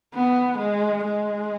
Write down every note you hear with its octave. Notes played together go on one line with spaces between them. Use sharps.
B3
G#3
G#3